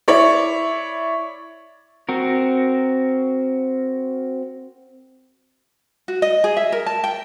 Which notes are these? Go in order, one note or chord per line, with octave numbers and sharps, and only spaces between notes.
E4 C#5 D5
C4 F#4 A#4
F#4
D#5
G#4
E5
A#4
A5
G5